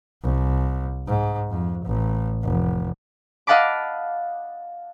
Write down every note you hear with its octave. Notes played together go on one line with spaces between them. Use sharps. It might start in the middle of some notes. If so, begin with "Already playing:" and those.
C2
G#2
F2
A1
F1
D#5 F5 F#5 A5 B5 D6